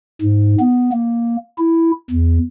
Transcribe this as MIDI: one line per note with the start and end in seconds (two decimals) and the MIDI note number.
0.21 0.55 44
0.60 0.90 59
0.92 1.36 58
1.58 1.91 64
2.11 2.39 40